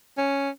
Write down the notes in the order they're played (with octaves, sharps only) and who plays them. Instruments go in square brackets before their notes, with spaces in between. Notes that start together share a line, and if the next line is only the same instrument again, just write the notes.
[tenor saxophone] C#4